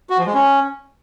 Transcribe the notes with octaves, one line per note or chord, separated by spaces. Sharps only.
F#4
F3
G#3
C#4